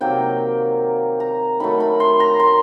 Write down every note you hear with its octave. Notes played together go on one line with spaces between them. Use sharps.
C3 D#3 F#3 A#3 G5
A#5
D#3 F#3 A3 B5
B5
C6
A#5
C6